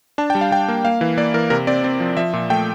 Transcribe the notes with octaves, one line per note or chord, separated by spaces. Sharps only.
D4 A5
G3 G5
F5
G3 G5
A#3
A#3 F5
E3
A#3 D5
E3 A#4
C3 A#4
C4 D5
C4
F3
F3 E5
A#2
A3 G5